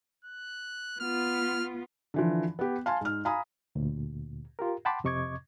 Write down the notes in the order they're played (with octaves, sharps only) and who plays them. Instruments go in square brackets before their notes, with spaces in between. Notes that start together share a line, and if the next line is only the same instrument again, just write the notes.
[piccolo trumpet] F#6
[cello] B3 F4 [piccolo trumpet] F6
[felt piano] D3 E3 F3
B3 G4
F5 G#5 A5 C6
G#2 F6
F5 G#5 A#5 B5 D#6
[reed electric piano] D2 A#2
F4 G4 A#4
F#5 G5 A5 B5 C6 D6
F2 C3 D#5 C#6 D6 G#6